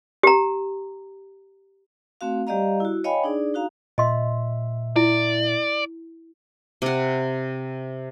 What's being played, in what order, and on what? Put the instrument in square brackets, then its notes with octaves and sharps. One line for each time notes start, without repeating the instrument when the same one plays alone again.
[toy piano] G4 A#5
[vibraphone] A3 C4 F#4 F5
G3 G4 D5 D#5 F5 A#5
E4 F#4
C#5 D#5 F5 G5 G#5 B5
D4 D#4 G#4 D5
D#4 F#4 F5 A#5
[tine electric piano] A#2 E5 [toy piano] D#5 C6
[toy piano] E4 [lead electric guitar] D5
[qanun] C3 F#5